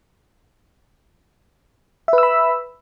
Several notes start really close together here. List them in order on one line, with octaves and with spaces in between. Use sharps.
E5 B4 E6 B5